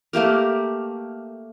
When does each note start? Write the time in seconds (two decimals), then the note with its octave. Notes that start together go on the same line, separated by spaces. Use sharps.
0.13 A3 A#3 G4 A#4